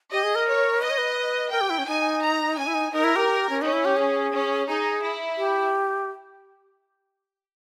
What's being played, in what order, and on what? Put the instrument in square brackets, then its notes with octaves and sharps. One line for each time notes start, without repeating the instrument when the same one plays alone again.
[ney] G4 [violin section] D#5
[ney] G#4
A#4
[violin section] C#5
[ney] B4 [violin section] D#5
[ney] C#5
B4
[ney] A#4 [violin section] G5
[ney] G4
E4
C#4
[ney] D#4 [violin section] G#5
[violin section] A#5
[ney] C#4 [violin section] G#5
[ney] E4
D#4
[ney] D#4 [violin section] A#4
[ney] E4
G4
C#4
[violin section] C#4 [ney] D#4
[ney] E4
G4
G#4
[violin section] C#4
[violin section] D#4 [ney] G#4
[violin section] E4
[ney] G4